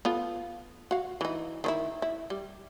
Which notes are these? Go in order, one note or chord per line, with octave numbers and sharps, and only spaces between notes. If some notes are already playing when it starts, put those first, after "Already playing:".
B3 F4 A4
F#4 F5
E3 D#4
D#3 D#4 E4
E4
G3